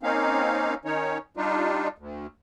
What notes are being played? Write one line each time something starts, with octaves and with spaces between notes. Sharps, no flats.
A#3 C4 C#4 D#4 F5
D#3 C#4 D#4 C#5
G3 D4 D#4 F4
D2